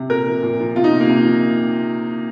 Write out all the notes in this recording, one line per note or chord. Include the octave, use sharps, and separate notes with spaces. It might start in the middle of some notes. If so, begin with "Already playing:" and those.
Already playing: C3
A#2 A#4
F3
A#2
F3
C3 F4
D#4
C3
A#3
C3
F3